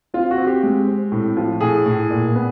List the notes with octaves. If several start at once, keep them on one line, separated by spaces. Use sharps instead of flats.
C4 F4
F#4
C4
G4
G#3
C4
A2
F3
A2 G#4
A2
A#2
B3